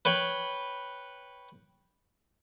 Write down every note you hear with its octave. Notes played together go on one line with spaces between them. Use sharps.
B4 C#5 G5 B5